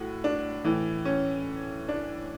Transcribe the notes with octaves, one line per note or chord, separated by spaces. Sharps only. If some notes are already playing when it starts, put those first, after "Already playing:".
Already playing: A2 F#4
D4
A2 E3
C#4
D4